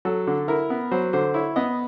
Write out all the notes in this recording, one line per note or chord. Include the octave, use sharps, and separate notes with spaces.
F#3 A4
D3
E4 A#4
B3
F#3 C5
D3 C5
E4 C#5
B3 D#5